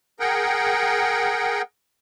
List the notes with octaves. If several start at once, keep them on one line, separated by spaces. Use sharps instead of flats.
G#4 A#4 F#5 G5